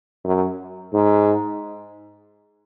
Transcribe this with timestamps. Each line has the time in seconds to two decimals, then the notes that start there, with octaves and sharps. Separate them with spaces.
0.24 F#2
0.93 G#2